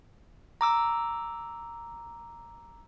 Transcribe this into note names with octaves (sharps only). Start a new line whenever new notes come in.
A#5 D6 E6